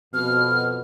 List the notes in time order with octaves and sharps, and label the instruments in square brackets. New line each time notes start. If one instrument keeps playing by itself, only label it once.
[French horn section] F2 B2 [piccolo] F6